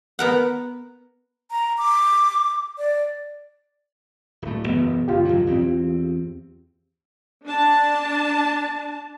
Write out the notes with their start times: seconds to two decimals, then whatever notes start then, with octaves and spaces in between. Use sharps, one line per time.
0.19 B3 A#4 F#5
1.51 A#5
1.78 D6
2.78 D5
4.42 D1 A3
4.65 F#1 E2 B2 B3
5.08 F#1 F4 G4
5.25 F2 D3 F#3
5.47 E2 C4
7.45 D4 A5